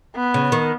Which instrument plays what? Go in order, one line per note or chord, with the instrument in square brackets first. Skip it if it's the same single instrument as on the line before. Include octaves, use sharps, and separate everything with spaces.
[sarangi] B3
[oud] C#3
D#3